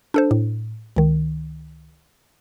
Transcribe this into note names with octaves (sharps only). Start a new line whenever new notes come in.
D4 A4 C5
A2
C#2 D#3